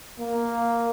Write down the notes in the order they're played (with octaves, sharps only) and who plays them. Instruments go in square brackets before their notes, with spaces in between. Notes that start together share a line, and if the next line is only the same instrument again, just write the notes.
[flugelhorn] A#3